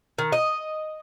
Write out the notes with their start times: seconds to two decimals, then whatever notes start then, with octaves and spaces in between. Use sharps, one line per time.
0.18 D#3
0.32 D#5